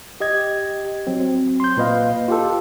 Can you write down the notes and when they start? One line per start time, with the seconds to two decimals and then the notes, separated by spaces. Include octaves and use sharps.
0.20 G4 D#5 G#6
1.07 F#3 C4
1.60 C6 G6
1.77 A#2 B4 D#5 F5
2.28 F4 G4 A4